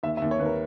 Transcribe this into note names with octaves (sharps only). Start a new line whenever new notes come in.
D#2 E5
E5
D#2
C#5
D#2 B4
A#4